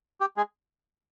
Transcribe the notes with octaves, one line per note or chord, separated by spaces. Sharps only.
G4
G#3 G#4